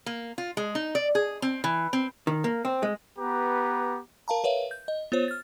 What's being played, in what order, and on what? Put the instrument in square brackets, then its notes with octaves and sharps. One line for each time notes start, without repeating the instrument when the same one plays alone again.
[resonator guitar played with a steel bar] A#3
F4
G#3
D#4
D5
G#4
C4
E3
C4
[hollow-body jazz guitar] D#3
A#3
C4
G#3
[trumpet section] B3 G4 B4 A#5
[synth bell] A#4 F5 A5 A#5
A#4 B4 C#5 E5 F5
G6
D#5
B3 F4 C5 C#5
F6 A6